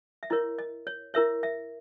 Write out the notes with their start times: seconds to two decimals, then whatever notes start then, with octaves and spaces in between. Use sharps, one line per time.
0.23 E5
0.30 E4 A#4 C#5 D#5
0.59 D#5
0.87 C#5
1.14 E4 A#4 C#5 E5
1.43 E5